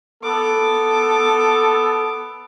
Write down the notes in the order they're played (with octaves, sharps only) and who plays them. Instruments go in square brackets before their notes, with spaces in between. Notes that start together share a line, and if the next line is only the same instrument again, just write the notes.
[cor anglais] B3 [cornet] A4 [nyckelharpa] D6